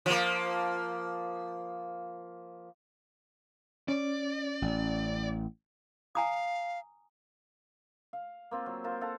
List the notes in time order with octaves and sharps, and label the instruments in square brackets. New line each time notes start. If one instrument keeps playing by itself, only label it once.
[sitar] F3 A#3
[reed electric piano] C#4 [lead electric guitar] D5
[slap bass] A1
[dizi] F5 [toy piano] G#5 A#5 D#6
[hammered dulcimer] F5
A#3 C4 F4
F#3
F4 A#4 C5 F5
A4 F5 F#5 A#5